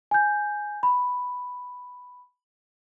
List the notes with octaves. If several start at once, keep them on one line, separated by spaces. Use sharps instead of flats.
G#5 G6
B5